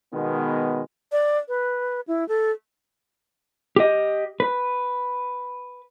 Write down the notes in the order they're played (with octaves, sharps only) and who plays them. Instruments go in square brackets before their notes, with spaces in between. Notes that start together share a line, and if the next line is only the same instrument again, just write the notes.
[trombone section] B2 D#3 G#3 B3
[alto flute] D5
B4
E4
A4
[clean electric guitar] G4 D#5
B4